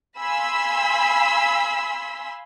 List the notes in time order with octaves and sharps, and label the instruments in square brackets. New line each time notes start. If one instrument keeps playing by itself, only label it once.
[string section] F5 G#5 B5 C6 E6 B6